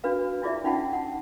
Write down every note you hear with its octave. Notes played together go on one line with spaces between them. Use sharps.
D4 F#4 B4 F5
D4 E4 F4 G#4 D5 E5
C#4 D#4 F4 F#5 G5 A5
F#5 A5